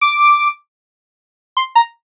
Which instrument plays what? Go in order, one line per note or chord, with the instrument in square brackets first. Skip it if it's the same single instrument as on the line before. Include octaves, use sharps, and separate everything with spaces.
[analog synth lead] D6
C6
A#5